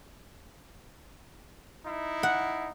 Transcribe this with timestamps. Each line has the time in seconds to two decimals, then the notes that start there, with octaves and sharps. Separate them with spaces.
1.85 D#4 E4
2.23 F#5